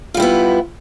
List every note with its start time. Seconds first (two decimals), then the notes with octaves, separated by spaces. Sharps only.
0.14 F4
0.17 G3
0.20 E4
0.22 B3